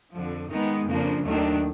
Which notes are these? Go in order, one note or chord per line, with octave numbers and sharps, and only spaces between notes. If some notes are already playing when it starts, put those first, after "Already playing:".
F2 D3 F3
D#3 G#3 B3 D#4
F2 C#3 F3 A#3 D4
D#2 D#3 F#3 A3 D4